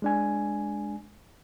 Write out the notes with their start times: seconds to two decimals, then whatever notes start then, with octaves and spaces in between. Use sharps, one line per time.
0.02 G#3 D4 G#5